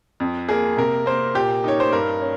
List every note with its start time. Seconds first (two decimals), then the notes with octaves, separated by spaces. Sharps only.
0.20 F2
0.49 A#3 G#4
0.77 C3 A#4
1.06 A#3 C5
1.35 A#2 G4
1.64 D#4 C#5
1.80 C5
1.92 G2 A#4
2.21 C#4